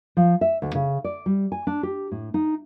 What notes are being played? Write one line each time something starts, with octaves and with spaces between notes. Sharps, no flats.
F3
E5
D2
C#3
D5
G3
G#5
D4
G4
A2
D#4